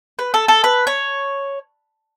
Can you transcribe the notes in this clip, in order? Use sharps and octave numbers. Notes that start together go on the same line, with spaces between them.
B4
A4
A4
B4
C#5